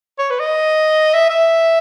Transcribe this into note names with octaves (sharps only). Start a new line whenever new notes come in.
C#5
B4
D#5
E5
E5